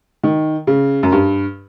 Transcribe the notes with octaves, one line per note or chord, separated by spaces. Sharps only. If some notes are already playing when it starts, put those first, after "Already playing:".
D#3
C#3
F#2
G2